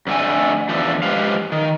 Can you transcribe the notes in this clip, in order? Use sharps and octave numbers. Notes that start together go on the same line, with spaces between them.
F2 D3 A3 G#5
E2 D3 F3 A3
F3 G#3 G4 B4 C5 F5
D#3